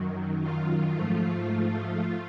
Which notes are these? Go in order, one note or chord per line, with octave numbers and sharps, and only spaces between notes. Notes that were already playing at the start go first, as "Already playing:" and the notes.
Already playing: F#2 D#3 F#3
F4
G#2 F3 A3
A3